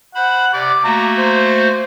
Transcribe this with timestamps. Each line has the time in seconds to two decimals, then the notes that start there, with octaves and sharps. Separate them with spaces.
0.15 C5 F#5 B5
0.53 C3 D5 D6
0.84 A3 A#3 F#4 A#5
1.18 C5